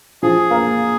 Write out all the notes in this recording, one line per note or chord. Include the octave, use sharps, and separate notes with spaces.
F3 G#4
A#3